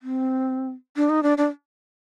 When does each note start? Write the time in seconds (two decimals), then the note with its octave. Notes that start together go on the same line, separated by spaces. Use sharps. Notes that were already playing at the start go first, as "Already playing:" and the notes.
0.03 C4
0.96 D4
1.10 D#4
1.23 D4
1.38 D4